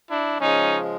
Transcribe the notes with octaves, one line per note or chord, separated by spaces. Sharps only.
D4 E4
C#3 F3 G#3 C#4 D#4